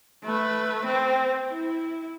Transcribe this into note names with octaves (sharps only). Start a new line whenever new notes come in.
A3 B4
C4
E4